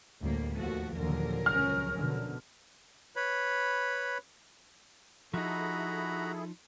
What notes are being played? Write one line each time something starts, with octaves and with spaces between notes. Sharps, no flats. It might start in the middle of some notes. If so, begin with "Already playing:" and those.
D2 A2 G3 A#3
D#2 F3 A3 F#4
D#2 A#2 D3 F3 F#3 A#4
C#2 C#4 F6
B2 D3
B4 C#5 B5
F3 D#4 E4 F#4 G#4 A4 A#5 B5